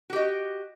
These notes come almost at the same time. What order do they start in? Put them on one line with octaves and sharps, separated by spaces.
F#4 G4 D#5